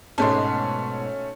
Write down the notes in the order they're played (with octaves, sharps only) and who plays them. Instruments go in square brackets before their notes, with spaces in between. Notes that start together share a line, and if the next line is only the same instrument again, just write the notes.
[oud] G#2 B2 [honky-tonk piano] A3 C#4 [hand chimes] A5 C6